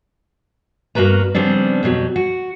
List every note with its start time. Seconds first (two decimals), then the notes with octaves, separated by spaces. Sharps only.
0.95 G2 A#3 F#4 B4 A#5
1.34 C#3 F3 G3 B3 C4 D4
1.83 F2 B2 F#3 G3
2.16 F#4